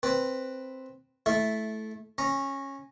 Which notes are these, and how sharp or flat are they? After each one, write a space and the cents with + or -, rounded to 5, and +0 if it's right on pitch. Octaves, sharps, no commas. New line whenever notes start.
C4 +0 B4 +0
A3 -15 E4 +0 E5 +0
C#4 -15 A#5 +0